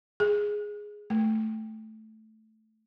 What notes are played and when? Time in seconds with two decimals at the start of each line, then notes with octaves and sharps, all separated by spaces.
0.20 G#4
1.10 A3